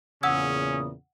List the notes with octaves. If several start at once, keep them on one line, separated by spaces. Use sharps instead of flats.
E2 A#2 C#3 C#4 F#5 D#6 E6 G#6